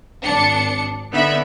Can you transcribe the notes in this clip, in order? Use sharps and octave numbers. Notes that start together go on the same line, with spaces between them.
G#1 D4 C#7
D3 B3 D#4 E5 B5